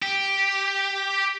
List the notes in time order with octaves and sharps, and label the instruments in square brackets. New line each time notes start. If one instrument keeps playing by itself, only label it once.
[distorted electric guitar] G4